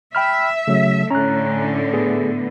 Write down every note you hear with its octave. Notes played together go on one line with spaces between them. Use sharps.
E5 G5 B5 F6
C#3 F#3 A3
A2 D3 C#4 A#5 F#6
B3 G#4